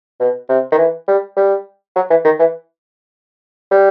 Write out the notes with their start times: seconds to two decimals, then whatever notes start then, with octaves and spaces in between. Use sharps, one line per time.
0.20 B2
0.49 C3
0.72 D#3
0.78 E3
1.08 G3
1.36 G3
1.96 F#3
2.10 E3
2.25 D#3
2.39 E3
3.71 G3